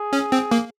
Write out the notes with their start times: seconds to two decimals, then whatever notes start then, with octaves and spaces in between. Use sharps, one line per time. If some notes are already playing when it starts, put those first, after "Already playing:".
Already playing: G#4
0.13 C#4
0.32 C4
0.51 A#3